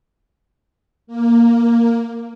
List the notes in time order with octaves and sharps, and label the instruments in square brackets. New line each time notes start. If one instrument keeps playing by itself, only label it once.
[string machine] A#3